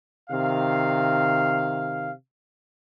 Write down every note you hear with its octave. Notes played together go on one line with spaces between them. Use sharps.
C3 D#3 F5